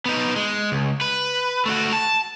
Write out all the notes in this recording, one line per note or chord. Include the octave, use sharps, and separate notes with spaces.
B3 D#4
G#3
C#2
B4
A3 F#4
A5